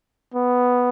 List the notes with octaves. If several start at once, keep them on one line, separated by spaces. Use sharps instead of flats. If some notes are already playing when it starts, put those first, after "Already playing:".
B3